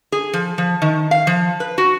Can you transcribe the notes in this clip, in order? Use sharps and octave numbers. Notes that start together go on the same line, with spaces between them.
G#4
F3
F3
D#3
F5
F3
B4
F#4